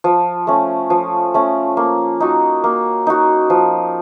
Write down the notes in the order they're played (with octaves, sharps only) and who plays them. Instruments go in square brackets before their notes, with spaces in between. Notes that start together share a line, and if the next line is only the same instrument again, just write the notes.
[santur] F3
A3 C#4
F3
A3 C#4
A#3
D#4 F#4
A#3
D#4 F#4
F3